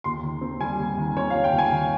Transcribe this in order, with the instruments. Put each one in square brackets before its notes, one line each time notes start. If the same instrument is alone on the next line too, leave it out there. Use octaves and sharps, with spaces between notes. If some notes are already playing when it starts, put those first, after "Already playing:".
[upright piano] D#2 C6
D#3
C4
G3 G#5
D#2
D#3
C4 C#5
G3 F5
G5
D#2
G#5
D#3